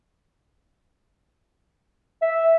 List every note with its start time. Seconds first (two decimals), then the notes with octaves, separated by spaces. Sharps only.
2.22 E5